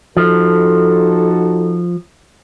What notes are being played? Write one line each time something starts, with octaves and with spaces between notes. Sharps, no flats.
F3 D#4 F#4 A4